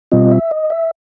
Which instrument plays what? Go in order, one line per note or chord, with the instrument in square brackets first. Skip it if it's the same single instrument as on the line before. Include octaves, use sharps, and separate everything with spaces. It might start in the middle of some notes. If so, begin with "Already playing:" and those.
[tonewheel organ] B2 G3 C4 F4 D#5
E5
D#5
E5